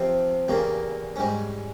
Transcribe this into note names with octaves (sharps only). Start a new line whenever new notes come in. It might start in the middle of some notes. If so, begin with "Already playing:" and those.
Already playing: C3 F3 C4
E2 C#3 G3 A#3
G#2 G3 C#4